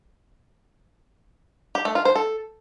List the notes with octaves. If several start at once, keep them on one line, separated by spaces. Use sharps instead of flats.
G4
A3
F4
C5
A4